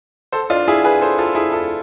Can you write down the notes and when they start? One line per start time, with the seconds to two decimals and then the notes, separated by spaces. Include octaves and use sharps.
0.32 A4 C5
0.50 D4 F4
0.68 E4 G#4
0.84 G#4 B4
1.01 A4 C5
1.18 F4 A4
1.35 E4 G#4
1.52 F4 A4